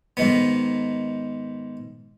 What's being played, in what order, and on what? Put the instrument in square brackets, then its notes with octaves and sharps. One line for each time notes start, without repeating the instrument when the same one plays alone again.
[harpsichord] G#2 D#3 B3